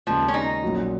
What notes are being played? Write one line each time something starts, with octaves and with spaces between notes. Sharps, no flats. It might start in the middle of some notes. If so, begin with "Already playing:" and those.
D#2 C#3 F3 G#3
C#4
D#4
A#1 A#2 F#3 C#4